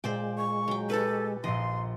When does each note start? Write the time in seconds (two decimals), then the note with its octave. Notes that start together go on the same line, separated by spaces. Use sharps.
0.04 A#2 G#3 C5 D5 G5
0.38 C#6
0.68 F#3 G5
0.90 G4 A4 B4
1.44 A#1 A#2 D#5 C6